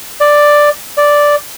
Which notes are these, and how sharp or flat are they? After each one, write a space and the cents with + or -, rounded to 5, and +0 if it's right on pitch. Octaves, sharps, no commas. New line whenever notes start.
D5 +5
D5 -5